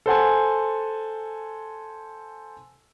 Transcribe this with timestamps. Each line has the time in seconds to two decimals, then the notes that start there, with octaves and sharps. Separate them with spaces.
0.06 A4 C5 F#5 G#5